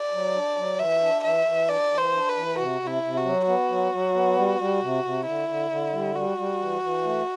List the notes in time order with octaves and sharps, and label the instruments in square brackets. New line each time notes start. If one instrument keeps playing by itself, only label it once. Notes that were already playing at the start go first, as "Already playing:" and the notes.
Already playing: [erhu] D5
[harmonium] F#3
D4
F#3
[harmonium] E3 [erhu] E5
[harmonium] D4
[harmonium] E3 [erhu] E5
[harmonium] E3
[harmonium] D4 [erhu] D5
[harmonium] E3
[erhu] C5
[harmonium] D4
[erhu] B4
[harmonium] E3
[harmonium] C3 [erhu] F#4
[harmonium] C3
[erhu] E4
[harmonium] C3
[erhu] F#4
[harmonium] F#3
[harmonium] B3 [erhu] F#4
[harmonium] F#3
F#3
B3
G3
G3
C3
C3
[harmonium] D3 [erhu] E4
[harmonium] D3
D3
G3
[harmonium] G3 [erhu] F#4
[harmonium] G3
E3
E3
A3